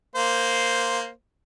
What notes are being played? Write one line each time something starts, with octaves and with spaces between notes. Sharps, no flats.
A#3 C5